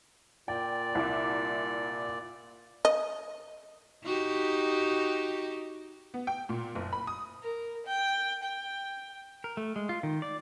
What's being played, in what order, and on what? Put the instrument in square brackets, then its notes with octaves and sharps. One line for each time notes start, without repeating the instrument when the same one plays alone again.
[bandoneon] A#2 D5 [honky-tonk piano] G5
[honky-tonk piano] C2 E5 D6
[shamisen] D#5
[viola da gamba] D#4 F#4 G4
[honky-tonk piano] B3
G5
A#2
F#1
B5
D#6
[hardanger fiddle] A#4
G5
G5
[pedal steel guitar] A#4
A3
G#3
F4
D#3
D5